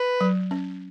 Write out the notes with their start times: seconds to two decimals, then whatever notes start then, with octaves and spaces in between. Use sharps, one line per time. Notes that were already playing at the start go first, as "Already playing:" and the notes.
Already playing: B4
0.21 F#3
0.51 C#4